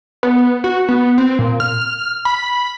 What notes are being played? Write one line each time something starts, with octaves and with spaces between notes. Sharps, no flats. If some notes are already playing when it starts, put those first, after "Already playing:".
B3
F#4
B3
C4
A#2
F6
B5